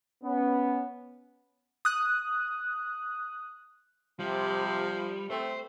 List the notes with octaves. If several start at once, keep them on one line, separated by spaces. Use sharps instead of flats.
B3 C#4
D#6 F#6
C3 F3 G3
A3 C4 C5